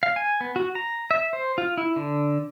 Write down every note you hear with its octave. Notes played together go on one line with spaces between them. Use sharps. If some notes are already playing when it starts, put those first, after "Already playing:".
F5
G#5
B3
F#4
A#5
E5
C5
F4
E4
D3